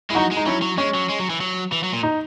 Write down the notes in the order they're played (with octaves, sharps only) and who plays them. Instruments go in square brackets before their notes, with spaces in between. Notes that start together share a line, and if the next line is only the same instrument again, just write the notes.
[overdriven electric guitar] G#3 [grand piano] E4
[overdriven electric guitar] F#3 [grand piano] D#4 F#4
[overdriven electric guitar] G#3
[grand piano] D#4
[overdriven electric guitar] F#3 [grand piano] C#4 E4
[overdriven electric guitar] F#3
[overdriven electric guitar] G#3 [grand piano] C#4
[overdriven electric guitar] F#3
G#3
F#3
E3
F#3
E3
F#3
A#2
[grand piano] D#4